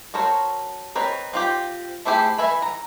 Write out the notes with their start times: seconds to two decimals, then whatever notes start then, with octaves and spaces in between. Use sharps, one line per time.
0.14 F#4 A4 A#4 C5 C#5
0.95 C4 A#4 B4 C#5 D#5
1.33 C4 F4 G4
2.05 A3 C4 E4 G4 G#4
2.38 E3 E5 G#5 B5
2.62 A#5